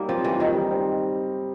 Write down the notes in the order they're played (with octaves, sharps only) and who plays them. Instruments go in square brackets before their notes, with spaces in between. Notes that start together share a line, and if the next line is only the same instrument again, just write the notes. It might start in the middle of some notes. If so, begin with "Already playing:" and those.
Already playing: [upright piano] F#3 G3 D#4 [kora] A#3
[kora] F3 [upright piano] C4
[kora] E3 [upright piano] G3
[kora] D#3 [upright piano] D#4
[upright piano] G3
C4